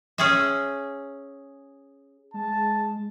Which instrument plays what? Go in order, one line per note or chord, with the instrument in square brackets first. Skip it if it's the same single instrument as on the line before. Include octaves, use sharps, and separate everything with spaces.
[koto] C#4 G#4 E5
[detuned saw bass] G#3 [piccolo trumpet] A5